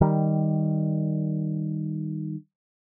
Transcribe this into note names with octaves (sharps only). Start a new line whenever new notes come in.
D#3 G3